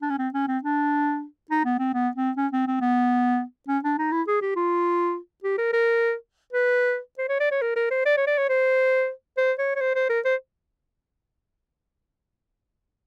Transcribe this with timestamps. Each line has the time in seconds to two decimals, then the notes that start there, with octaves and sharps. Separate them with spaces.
0.02 D4
0.10 C#4
0.19 C4
0.34 C#4
0.48 C4
0.63 D4
1.51 D#4
1.65 B3
1.79 C4
1.94 B3
2.16 C4
2.37 C#4
2.53 C4
2.67 C4
2.81 B3
3.68 C#4
3.84 D4
3.98 D#4
4.12 E4
4.28 G#4
4.42 G4
4.56 F4
5.44 G4
5.58 A#4
5.73 A#4
6.53 B4
7.18 C5
7.29 C#5
7.40 D5
7.51 C#5
7.62 A#4
7.76 A#4
7.91 C5
8.06 D5
8.17 C#5
8.27 D5
8.38 C#5
8.49 C5
9.37 C5
9.59 C#5
9.76 C#5
9.81 C5
9.95 C5
10.10 A#4
10.25 C5